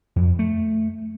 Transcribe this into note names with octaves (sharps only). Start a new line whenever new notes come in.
F2
A3